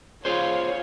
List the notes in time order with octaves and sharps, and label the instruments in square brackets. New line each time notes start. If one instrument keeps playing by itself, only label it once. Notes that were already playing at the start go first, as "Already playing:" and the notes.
[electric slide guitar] F4 G#4 C5 [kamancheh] C#5 F5